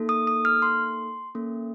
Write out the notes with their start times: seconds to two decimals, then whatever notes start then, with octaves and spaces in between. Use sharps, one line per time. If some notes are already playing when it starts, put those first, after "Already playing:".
Already playing: A#3 D#4 A4
0.09 D#6
0.27 D#6
0.45 F6
0.62 C6
1.35 A#3 C#4 A4